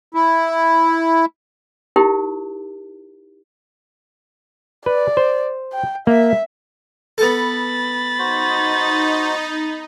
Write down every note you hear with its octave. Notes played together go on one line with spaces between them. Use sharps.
E4
D#4 E4 G4 A#4
B4 D5
C5
G5
A#3 E5
B3 A4 B5 A6
D#4 F#4 C5